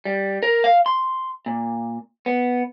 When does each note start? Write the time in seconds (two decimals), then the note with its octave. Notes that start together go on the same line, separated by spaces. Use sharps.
0.05 G3
0.43 A#4
0.64 F5
0.86 C6
1.46 A#2
2.26 B3